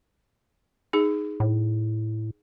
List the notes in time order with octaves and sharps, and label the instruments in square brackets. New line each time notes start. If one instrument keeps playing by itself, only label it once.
[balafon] D#4 G#4
[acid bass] A2